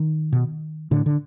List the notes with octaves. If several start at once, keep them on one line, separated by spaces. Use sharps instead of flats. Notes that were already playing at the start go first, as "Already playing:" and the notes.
Already playing: D#3
B2
A2 D3
D3